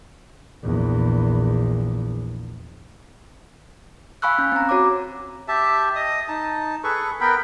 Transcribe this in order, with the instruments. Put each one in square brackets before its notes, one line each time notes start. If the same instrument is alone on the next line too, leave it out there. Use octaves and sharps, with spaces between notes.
[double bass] A#1 E2
[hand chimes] F5 G#5 B5 C#6 E6 F#6
C#4
C4 A#5
F#4 C#5 A#5 D6
[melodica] G4 E5 A5
D#5 D#6
D#4 A5
G#4 A4 B4 C#6
B3 A#4 G5 B5